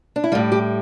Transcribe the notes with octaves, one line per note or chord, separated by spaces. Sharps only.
D4
E4
A2 G3 F4
G4